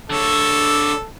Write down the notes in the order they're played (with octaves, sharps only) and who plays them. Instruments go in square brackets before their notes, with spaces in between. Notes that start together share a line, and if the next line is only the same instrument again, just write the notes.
[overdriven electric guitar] D3 C#5 [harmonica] A4